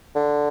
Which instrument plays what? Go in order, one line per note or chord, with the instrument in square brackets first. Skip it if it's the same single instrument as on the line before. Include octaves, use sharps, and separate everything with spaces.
[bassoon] D3